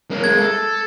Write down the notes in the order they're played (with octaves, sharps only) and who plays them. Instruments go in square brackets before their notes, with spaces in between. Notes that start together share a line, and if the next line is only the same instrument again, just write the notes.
[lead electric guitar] A#3 C#4
[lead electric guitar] G#3 A#3 [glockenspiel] G#6
[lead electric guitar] A4